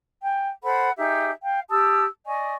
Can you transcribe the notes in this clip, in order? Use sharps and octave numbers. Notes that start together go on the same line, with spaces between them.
G5 G#5
A4 C5 F#5 B5
D#4 G4 G#4 E5
F5 G5
G4 A5 D#6 E6
D5 D#5 G#5 C#6